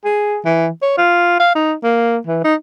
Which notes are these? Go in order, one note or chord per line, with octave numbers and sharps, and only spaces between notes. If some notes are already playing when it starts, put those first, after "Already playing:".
G#4
E3
C#5
F4
F5
D#4
A#3
E3
D#4